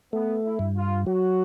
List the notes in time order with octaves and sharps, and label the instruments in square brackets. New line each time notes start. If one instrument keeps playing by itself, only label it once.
[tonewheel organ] A3 [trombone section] B3
[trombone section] E4
[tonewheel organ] G2
[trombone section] F4
[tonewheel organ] F#3 [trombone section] F#4